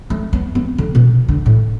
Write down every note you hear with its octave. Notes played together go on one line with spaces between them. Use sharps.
A3
B3
B3
D3
B2
D3
A2